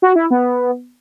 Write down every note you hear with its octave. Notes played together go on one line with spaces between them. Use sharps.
F#4
E4
B3